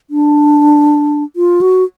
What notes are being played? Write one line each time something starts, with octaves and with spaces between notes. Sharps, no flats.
D4
F4
F#4